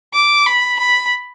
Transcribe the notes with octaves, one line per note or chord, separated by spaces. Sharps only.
D6
B5
B5